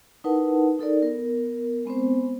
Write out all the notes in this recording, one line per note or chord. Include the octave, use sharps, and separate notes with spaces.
D#4 E4 A#4 B4 F#5 A5
D#4 A4 A#4 D5
B3 A#4
G#3 B3 C4 C5